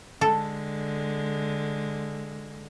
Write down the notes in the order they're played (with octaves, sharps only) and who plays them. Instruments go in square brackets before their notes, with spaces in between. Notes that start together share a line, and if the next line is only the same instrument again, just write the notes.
[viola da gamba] D3 G#3 [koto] A4